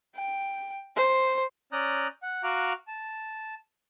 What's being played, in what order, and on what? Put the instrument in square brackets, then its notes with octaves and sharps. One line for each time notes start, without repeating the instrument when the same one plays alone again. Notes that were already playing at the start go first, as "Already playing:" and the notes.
[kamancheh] G5
C5
[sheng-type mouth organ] C#4 D5 A#5 D#6 F#6 G6
F#5
F#4 F5 A#5 D6 F#6
A5